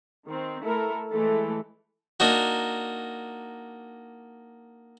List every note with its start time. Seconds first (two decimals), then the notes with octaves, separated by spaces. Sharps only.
0.28 D#3 C4
0.64 A3 E4 A4 A#4
1.11 E3 G#3 A3 A4
2.20 A#3 D4 D#4 F#4